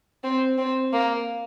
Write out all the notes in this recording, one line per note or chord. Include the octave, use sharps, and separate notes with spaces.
C4
C4
A#3